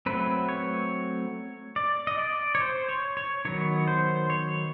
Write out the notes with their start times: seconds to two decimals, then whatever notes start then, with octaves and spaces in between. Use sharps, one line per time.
0.06 F#3 A3 C4 B4
0.49 C#5
1.76 D5
2.07 D#5
2.19 D5
2.55 C#5
2.61 C5
2.89 C#5
3.17 C#5
3.45 D#3 F#3 B3 C#5
3.88 C5
4.30 C#5